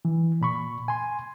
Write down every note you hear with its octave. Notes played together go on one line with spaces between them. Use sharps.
E3
A#2 B5 C#6
G#5 C6